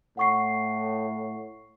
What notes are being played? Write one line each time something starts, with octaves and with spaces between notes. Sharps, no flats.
A2 F#5 C#6 C7